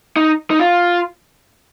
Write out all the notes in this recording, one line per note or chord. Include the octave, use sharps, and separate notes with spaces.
D#4
D#4
F4